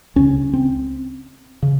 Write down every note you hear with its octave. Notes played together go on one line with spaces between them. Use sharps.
C#2 C#3 C#4
C4
C#3